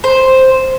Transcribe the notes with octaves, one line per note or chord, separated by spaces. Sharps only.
C5